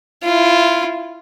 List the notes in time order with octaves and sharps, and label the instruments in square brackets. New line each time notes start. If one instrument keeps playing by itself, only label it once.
[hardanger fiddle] E4 F4